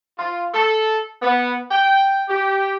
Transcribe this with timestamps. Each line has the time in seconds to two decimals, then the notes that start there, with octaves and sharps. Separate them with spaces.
0.17 F4
0.54 A4
1.21 B3
1.71 G5
2.29 G4